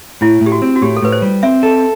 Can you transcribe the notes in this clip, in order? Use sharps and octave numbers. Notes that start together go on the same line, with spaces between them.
A2 E4
A2
G4
F#4
C4
F#4
A2 G4
A4
A2 B4
C5
G3
C4 E5
A4